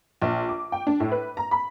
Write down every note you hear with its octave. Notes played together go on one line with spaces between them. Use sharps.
A#1
D6
G5
D4
A2
B4
A#5
B5